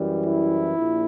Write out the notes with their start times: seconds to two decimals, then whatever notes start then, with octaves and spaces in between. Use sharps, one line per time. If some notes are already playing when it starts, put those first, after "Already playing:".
Already playing: F#2 E3 G3
0.25 E4
0.77 A#1 A#2